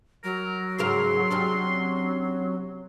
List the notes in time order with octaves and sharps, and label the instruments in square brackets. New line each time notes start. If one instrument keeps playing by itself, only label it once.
[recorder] F#3 [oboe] A#4
[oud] G#2 C#3 A#4 [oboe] C6
[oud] C3 C#4 D4